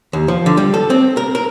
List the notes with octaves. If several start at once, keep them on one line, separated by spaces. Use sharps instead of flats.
D#2
F3
D3
G3
A4
C4
A#4
A#4